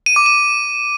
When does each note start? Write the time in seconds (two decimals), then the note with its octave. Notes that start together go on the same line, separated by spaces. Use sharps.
0.06 D#7
0.16 D6
0.26 D#7